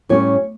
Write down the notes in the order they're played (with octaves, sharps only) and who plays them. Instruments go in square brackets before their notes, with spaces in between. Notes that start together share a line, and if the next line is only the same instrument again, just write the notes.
[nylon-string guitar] A2 G3 C#4 C#5